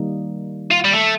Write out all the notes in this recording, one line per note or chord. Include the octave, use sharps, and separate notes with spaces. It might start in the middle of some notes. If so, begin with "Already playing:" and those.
Already playing: D#3 G3 A#3 D#4
F4
G3
A3